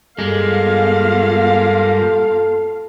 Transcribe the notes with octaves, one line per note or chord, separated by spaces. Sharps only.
G2 G#3 A#3 B3 F4 A4 F5